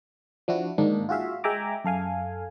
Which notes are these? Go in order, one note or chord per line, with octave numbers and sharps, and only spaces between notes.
F3 D4 E4 F#4
G#2 D#3 A#3 D4 D#4
F4 F#4 G#4 E5 F5
G#3 E5 G5 G#5 A#5 D6
F#2 A4 F5 G#5